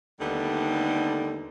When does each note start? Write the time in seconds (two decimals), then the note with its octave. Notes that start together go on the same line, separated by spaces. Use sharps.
0.20 D#2 D3 G3 A3 B3 D#4